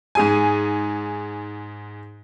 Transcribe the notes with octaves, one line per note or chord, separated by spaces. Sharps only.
G#2 G#4 G#5